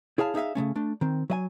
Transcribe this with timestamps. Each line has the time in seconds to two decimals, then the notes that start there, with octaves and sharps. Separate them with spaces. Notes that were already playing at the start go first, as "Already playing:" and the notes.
0.18 E4 G#4 C#5 F5 A5
0.35 D#4 G#4 E5 F5
0.55 C#3 E3 A3 C#4
0.76 A3 D4
1.01 D#3 C4
1.30 F#3 D#5 G#5